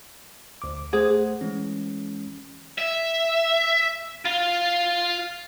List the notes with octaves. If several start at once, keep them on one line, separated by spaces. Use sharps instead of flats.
D2 D6
A3 G#4 C5 F#5
E3 G#3 C#4
E5
F4